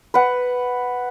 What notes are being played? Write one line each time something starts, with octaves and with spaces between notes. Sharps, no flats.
B4 F#5